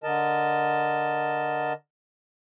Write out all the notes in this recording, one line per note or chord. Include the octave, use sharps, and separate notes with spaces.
D3 A#4 D#5 A5